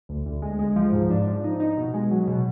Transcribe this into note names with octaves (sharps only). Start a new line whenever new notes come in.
D2
D2
G#3
G#3
F3
G#2
D4
F3
D#4
D#4
B2
G#3
F#3
B2